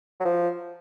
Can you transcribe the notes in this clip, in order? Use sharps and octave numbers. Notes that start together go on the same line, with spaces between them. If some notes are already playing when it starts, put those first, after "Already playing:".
F#3
F3